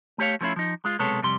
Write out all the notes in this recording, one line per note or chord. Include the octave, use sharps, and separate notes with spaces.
A3 G4 C#5 F5
F3 A3 B3 C#4 E4 F4
F3 D#4
G#3 F4
B1 C3 G#3 B3 A4 C#5
C2 F2 C3 G3 C6